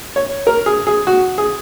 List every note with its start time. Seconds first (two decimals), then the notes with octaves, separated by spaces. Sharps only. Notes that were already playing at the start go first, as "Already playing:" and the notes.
0.16 C#5
0.47 A#4
0.66 G#4
0.87 G#4
1.07 F#4
1.38 G#4